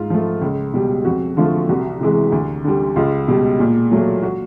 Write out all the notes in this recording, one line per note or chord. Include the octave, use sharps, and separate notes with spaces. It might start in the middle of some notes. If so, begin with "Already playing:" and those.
Already playing: G#2 F4
F3 A3
C#2
B2 G3
F2 F#4
D3 F3 A3 F4
C2 F#4
C3 E3 G#3
D2
D3 G3
C#2 F4
B2 G3
A#2
F#3 A3
F#4